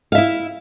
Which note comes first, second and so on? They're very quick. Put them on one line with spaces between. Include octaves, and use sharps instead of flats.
F5 E5 E4